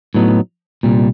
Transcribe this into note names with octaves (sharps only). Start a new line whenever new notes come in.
A2 F#3 B3 D#4
C2 A#2 G3